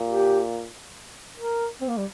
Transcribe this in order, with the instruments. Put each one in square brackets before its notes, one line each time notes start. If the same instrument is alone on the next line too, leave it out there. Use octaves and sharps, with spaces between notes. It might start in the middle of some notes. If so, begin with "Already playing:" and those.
Already playing: [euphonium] A#2
[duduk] G4
A#4
C4
A#3
G3